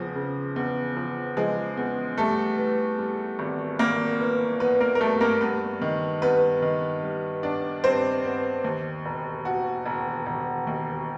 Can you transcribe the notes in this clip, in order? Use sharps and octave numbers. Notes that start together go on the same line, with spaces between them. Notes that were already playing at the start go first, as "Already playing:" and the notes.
Already playing: E2 C#3 F3
C#3
E2
F3
F3 G#3 G#4
E2
G3 A3 A4
E3
G3
G#1
G#1 A#3 A#4
E3
E3 B3 B4
A#3 A#4
A#4
G2 A3 A4
A#3 A#4
G2 B3 B4
D#3
G2 B3 B4
D#3
G3
B3 D4 D5
G2 C4 C5
B3
D#2
E1
E1 F#4
E1
E1
D#2